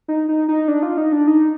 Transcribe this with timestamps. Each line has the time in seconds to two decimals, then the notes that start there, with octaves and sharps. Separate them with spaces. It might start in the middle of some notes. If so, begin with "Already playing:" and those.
0.08 D#4
0.29 D#4
0.48 D#4
0.68 D4
0.83 F4
0.97 D#4
1.12 D4
1.27 D#4